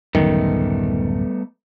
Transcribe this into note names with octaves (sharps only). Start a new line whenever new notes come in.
D1 F#2 D#3 G3 A3 B3